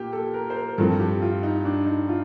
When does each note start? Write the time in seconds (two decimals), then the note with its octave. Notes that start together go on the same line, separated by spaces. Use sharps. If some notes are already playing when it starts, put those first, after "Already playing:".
Already playing: A#2 A#3 G4
0.13 A4
0.34 A#4
0.50 C5
0.56 A#4
0.78 G2 F3 C4 A4
0.99 G4
1.22 F4
1.43 D#4
1.65 D4
1.86 D#4
2.09 F4